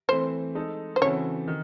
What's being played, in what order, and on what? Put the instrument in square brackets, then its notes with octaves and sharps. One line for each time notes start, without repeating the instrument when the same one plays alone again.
[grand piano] E3 A3 C4 [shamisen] C5
[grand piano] G#3 D#4 A4
[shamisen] C5
[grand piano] C#3 E3 C4 F#4 A4 [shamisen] C#5
[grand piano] D#3